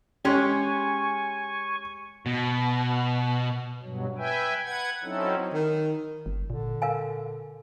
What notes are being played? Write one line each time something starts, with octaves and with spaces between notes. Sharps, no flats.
G#3 C#4 G4 C#5 G#5 C#6
B2
G2 B2 F#3
B4 E5 G5 G#5
B4 F#5 G#6
F#3 C4 C#4 D#4 E4 A4
D#3
G1
A#2 D3
A#4 F5 G#5